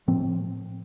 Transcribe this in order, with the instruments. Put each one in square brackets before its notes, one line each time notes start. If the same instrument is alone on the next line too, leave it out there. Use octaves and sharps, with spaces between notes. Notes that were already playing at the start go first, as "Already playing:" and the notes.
[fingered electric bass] A2 F3 C4